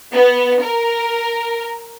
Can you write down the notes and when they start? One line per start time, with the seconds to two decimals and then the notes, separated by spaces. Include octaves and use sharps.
0.12 B3
0.62 A#4